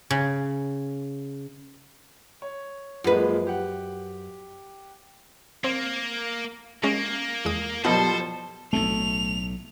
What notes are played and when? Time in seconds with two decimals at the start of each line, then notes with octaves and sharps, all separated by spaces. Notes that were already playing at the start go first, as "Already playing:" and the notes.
0.11 C#3
2.42 C#5
3.04 F#2 F3 G#3 A#3 B4
3.47 G4 F#5
5.64 A#3 C4
6.83 G#3 A#3 C#4 D#5
7.45 E2 G#3 D#6
7.85 B2 F3 G3 A4 A#4 C5 D#5 F#5
8.73 B1 A2 A3 F7